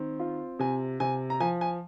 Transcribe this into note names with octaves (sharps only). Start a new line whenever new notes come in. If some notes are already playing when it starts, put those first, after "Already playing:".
Already playing: D#3 C4
F4
C3 G#5
C3 G#5
A#5
F3 G#5
G#5